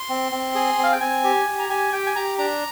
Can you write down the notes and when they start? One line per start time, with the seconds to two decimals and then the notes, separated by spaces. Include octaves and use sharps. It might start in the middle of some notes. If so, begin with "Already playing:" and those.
Already playing: C6
0.09 C4
0.32 C4
0.55 G#4
0.78 C4
0.83 F5
0.92 G5
1.01 C4 G#5
1.24 G4
1.46 G4
1.59 A#5
1.70 G4 G#5
1.93 G4 G5
2.06 G#5
2.16 G4 A#5
2.38 D4 A#5